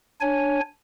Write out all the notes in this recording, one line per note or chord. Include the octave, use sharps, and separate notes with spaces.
D4 C#5 G#5